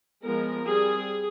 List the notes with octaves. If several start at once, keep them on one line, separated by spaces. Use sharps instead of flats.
F3 G#3 B3 A#4
G3 C4 G#4